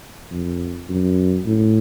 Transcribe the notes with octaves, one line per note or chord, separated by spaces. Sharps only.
F2
F#2
A2